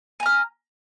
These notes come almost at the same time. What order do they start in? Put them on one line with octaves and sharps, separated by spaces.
G#5 A#5 F6